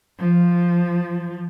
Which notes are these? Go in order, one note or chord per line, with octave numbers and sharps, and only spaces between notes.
F3